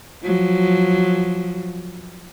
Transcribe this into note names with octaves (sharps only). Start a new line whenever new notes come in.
F3 F#3